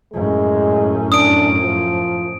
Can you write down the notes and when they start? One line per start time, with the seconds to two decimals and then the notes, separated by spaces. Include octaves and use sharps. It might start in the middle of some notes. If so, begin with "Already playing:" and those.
0.14 F#2 A2 G#3
1.12 D4 D#6 D7
1.62 F3